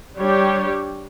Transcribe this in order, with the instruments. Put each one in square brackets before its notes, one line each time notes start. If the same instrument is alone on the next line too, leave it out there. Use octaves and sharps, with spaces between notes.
[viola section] G3 D4 G4 C#5